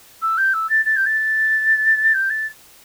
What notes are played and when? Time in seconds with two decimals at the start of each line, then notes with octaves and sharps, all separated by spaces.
0.22 E6
0.38 G6
0.54 E6
0.70 A6
0.86 A6
0.96 G6
1.06 A6
2.14 G6
2.30 A6